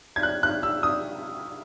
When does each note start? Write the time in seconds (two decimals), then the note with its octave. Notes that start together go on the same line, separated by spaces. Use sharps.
0.16 G#6
0.23 F#6
0.43 F#6
0.63 E6
0.83 D#6